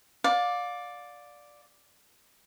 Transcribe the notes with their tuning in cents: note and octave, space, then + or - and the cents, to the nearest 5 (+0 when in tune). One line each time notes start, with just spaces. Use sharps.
D5 +0 F5 +30